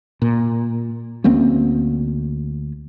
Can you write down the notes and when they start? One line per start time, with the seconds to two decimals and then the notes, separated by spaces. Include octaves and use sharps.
0.22 A#2
1.24 D2 A#3 C4 C#4